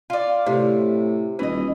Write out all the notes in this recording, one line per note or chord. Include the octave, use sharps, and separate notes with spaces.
F4 D5
A2 C3
D#1 E3 D#5